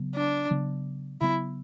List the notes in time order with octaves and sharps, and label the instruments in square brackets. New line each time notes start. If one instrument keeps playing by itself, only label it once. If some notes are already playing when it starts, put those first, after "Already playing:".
Already playing: [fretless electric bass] C#3 F#3 B3
[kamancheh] D4
[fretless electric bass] C#3 F#3 B3
[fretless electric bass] C#3 F#3 B3 [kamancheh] E4